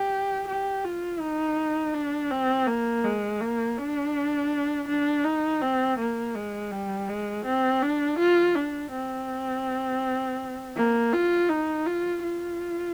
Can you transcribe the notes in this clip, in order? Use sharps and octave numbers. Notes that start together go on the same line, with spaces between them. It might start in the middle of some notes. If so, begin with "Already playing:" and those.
Already playing: G4
G4
F4
D#4
D4
C4
A#3
G#3
A#3
D4
D4
D#4
C4
A#3
G#3
G3
G#3
C4
D4
F4
D4
C4
A#3
F4
D#4
F4
F4